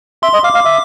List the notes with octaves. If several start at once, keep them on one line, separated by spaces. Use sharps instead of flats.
E5 C6
D#5
F5 D6
F5
E5